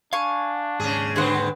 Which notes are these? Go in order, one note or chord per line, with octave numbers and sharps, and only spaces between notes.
D4 F5 G#5 C#6
D#2 G#2 C#3 G#4
D3 B3 C4 G#4 C5 F#5